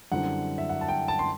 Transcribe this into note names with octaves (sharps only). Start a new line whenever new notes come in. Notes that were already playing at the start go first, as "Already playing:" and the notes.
F#2 D3 G3 C4 E4 F#5
E5
F#5
A5
G5
A5
C6